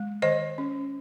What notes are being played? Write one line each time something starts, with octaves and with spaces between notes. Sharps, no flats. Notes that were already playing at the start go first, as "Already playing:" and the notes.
Already playing: G#3
D#3 C5 D#5
C#4